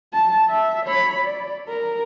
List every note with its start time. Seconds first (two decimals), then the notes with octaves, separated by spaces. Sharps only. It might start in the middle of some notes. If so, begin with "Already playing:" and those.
0.14 A5
0.49 E5
0.86 C#5 B5
1.24 D5
1.69 A#4